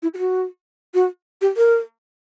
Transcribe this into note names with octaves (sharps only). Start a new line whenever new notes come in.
E4
G4
F#4
F#4
G4
A#4